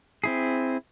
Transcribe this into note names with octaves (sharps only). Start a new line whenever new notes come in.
C4 E4 G#4